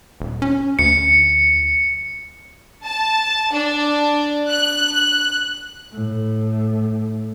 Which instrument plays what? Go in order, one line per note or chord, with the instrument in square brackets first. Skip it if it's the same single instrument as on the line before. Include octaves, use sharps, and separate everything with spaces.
[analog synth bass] D#1
C#4
[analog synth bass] D2 [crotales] C#7
[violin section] A5
D4
F#6
[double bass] A2 A3